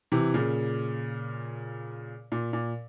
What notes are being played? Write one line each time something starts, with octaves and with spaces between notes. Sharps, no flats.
C3 E3
A#2 C#3
A#2
A#2